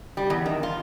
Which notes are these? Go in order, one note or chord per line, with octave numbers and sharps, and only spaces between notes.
G3
E2
D#3
F4